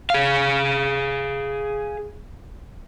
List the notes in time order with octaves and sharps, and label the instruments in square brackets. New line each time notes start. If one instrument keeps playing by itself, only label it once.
[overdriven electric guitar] G#4 F5